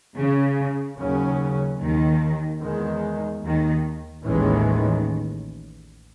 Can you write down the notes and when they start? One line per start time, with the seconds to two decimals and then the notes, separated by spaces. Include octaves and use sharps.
0.16 C#3
0.98 D#2 C#3 F#3 C#4
1.80 D#2 D#3
2.62 E2 D#3 G#3
3.44 D#2 D#3
4.26 A1 D#2 A2 D#3 E3 G#3 C#4